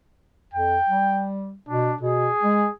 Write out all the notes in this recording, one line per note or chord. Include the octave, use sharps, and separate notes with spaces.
F2 G5
G3
B2 D4
B2 G#4
G#3